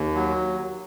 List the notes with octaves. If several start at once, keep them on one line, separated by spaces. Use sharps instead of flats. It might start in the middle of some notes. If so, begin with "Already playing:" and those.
Already playing: D#2
F#3